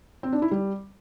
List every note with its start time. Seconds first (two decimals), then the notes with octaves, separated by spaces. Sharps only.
0.23 C4
0.33 D4
0.42 E4
0.51 G3